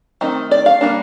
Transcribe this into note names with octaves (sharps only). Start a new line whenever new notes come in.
D#3 A3 C4 D#4
D5
F5
G3 A#3 D4